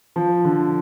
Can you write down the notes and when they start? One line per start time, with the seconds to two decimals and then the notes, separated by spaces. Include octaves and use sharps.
0.16 F3
0.45 D3